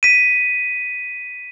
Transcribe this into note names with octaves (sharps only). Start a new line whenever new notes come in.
B6 D#7